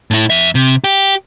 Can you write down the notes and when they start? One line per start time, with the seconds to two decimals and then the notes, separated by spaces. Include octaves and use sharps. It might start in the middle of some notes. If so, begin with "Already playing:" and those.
0.11 A2 E4
0.30 F2 E5
0.55 C3
0.84 G4